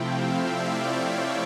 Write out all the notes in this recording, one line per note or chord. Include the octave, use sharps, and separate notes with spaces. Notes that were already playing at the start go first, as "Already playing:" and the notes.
Already playing: C3 F3 A3 C4 E4 F5 G5
E5
D5
C#5
C#5